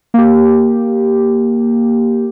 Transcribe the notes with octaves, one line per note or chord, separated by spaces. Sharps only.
A#3 G4